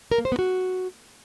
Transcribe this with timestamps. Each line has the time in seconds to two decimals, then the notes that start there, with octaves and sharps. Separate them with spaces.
0.11 A#4
0.18 A#3
0.25 C5
0.32 B3
0.39 F#4